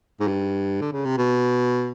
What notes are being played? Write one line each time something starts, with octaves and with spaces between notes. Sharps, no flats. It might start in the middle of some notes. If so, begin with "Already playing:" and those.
G#2
G2
D3
C#3
C3
B2